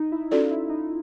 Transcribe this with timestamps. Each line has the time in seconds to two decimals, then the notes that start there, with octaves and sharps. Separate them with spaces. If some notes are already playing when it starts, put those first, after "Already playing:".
Already playing: D#4
0.12 E4
0.31 C#4 F4 F#4 A4 D5
0.51 E4
0.70 D#4